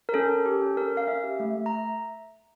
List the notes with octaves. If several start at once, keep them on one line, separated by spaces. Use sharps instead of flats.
A#4
C#4 A4
C#4
G4
C#4
C#4 A#4
C#4 F5
C#4 E5
G4
A3
A3
A#5